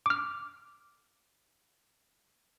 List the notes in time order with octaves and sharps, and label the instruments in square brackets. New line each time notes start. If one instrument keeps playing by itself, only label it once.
[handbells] D6 F6